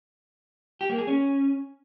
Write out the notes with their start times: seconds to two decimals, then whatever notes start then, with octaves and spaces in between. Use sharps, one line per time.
0.81 G4
0.90 A#3
0.98 G#4
1.07 C#4